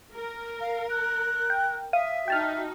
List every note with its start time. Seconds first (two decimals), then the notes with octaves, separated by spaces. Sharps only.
0.15 A#4
0.61 F5
0.90 F#6
1.50 G5
1.93 E5 F5 D#6
2.28 D#4 F#4 G5 A5 F6